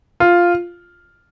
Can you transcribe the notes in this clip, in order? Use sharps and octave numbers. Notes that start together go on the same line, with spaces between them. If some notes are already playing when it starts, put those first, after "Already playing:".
F4